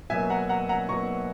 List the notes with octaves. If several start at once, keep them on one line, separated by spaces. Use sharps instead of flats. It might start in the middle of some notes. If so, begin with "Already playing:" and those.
B2 F#3 A#3 E5 G#5
F#5 A#5
F#5 A#5
F#5 A#5
B2 F#3 A#3 A#5 C#6